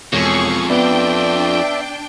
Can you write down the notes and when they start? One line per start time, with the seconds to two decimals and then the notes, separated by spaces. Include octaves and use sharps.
0.13 E1 F2 G#4 C#5 C#6
0.70 B3 D4 D5 E5 G5